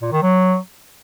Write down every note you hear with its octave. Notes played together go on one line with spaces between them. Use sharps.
A#2
D#3
F#3